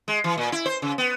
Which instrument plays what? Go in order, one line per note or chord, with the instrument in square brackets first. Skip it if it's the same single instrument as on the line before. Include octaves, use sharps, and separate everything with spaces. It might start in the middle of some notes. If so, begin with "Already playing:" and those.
[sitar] G#3
E3
A#2
E4
C5
C#3
B3